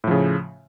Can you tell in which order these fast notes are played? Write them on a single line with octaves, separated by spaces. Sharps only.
A2 F3 C#3